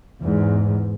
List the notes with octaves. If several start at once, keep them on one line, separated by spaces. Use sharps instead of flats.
E2 G#2